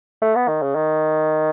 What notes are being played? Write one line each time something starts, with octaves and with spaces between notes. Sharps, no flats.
A3
B3
D#3
C#3
D#3